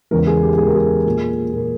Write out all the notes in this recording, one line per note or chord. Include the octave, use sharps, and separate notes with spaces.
E2 C#3 E3 G#3 A#4
G#4
G4
E2 C#3 E3 G#3 G#4
A#4
G#4
A#2 A#3
A#2 A#3